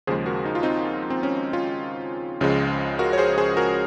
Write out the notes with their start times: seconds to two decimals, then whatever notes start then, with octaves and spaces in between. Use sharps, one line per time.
0.07 D#2 C#3 F3 G#3 G#4 C5
0.26 F#4 A#4
0.45 D#4
0.55 F4
0.63 C4 D#4
1.10 C4
1.23 C#4
1.53 C#4 F4
2.41 C#2 C#3 F3 G#3
2.99 F#4 A#4
3.13 C#5
3.18 G#4 C5
3.38 G#4 C5
3.57 F#4 A#4